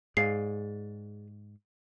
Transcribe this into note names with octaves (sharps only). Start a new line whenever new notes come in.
G#2 G#4 D5 F5 C7